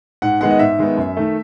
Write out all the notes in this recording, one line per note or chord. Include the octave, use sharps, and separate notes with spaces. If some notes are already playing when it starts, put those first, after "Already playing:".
G#2 F#5
D#3 G#3 B3 F#5
D#5
G#2 E5
D#3 G#3 B3
F#2
D#3 A3